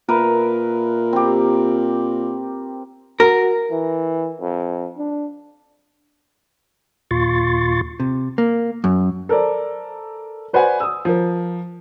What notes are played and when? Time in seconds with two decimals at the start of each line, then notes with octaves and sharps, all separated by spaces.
0.09 A#2 A#4 B4 E5
1.13 C4 G4
3.20 F#4 A#4
3.71 E3
4.41 F2
4.98 D4
7.11 D#2 A#2 F4 C6 C#6 A6
8.00 C3
8.38 A#3
8.84 F#2
9.29 A4 A#4 C5 D5
10.53 F#4 B4 C5 D5 F#5 G#5
10.80 D#6 E6
11.05 F3 A#4